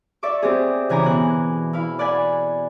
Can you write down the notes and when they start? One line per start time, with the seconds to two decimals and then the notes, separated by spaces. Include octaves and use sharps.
0.23 D5 E5 C#6 D6
0.42 C4 G4 G#4
0.89 C#3 E3 G#5 A#5 D6
1.04 B2 F#6
1.73 E4 F5 B5
1.99 D5 F#5 G#5 B5